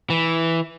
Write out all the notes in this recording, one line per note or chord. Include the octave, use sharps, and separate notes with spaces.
E3